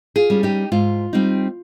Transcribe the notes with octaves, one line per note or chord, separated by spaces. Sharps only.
F4 G#4
G3 C#4
D#4 G4
G#2 F4
G3 C4 D#4